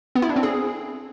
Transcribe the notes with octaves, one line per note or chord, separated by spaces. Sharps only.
B3
E4
D4
C4
G#4